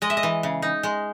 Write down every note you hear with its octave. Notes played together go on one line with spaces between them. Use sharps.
G#3 D#5
E5
D#5
E3
C#3
D#4
G#3